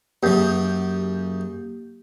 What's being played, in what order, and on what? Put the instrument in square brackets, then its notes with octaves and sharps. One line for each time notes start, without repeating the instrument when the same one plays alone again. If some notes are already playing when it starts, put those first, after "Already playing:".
[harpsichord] F#2 C#3 [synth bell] A#3 G4 G6